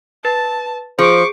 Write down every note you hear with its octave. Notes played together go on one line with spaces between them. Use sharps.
B4 A5 A6
F3 G#4 C5 C#6 D6